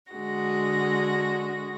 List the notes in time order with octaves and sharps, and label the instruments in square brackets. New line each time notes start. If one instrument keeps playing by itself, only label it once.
[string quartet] D3 G#3 F#4 A#6